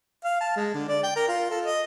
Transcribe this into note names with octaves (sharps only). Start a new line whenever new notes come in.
F5
A5
G#3
D3
D5
G5
A#4
F4
A4
D#5